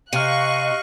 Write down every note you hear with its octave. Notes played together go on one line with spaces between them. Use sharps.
C3 D#5 F5 C#6 F6 F#6 D#7